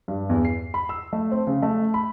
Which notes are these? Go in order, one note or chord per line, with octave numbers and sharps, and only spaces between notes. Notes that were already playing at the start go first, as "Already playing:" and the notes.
G2
E2
C7
B5
E6
A3
C4
C#3
A3
B5